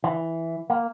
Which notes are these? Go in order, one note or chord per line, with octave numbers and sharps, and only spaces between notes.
E3
A#3